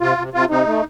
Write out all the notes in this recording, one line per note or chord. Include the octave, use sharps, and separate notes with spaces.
C3 F4
C3
C3 F4
C3 D#4
A3